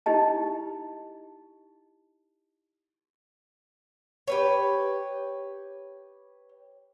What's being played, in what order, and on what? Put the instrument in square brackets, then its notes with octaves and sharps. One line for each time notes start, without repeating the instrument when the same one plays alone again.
[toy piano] D#4 E4 G4 D#5 A5
[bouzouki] G4 B4 C#5